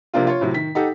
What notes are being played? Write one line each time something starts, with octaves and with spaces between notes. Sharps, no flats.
C3 F3 A#3 D4 F4
F4 C#5
A2 C3 F#3
D#3 B6
D#4 G4 A4 F#5